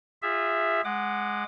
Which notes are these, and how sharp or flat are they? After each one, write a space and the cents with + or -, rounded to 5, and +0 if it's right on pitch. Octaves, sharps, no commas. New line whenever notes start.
F4 +5 G#4 -30 E5 +0
G#3 +0 F#5 +0 D6 +30